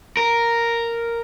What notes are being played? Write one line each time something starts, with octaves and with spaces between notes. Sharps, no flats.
A#4